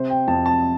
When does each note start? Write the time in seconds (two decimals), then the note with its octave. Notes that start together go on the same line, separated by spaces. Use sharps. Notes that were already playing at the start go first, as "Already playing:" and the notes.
Already playing: C3 C5
0.10 G5
0.27 F2 A5
0.46 A5